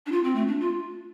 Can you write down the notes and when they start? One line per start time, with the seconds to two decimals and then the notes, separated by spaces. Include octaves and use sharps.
0.06 D4
0.12 F4
0.24 C4
0.35 A3
0.47 D4
0.60 F4